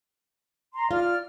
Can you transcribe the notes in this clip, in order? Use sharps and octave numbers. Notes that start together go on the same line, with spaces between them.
A#5 C6
F4 D5 F6